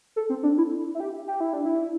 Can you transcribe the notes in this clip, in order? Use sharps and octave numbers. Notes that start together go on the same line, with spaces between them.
A4
C4
D4
E4
E4
G4
G4
E4
D4
E4